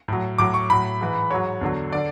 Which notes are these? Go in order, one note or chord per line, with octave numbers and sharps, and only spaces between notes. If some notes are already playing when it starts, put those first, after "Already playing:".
A2 F#3
A2 F#3 D6
C#6
A2 F#3 B5
G#2 E3
G#2 F#3 C#5
E2 D3 F#3
D3 D5